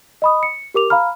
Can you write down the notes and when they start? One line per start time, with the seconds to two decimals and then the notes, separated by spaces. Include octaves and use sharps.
0.22 D#5 B5 D#6
0.43 C#7
0.74 G4 A#4 D6 F7
0.90 F5 A#5 B5 F6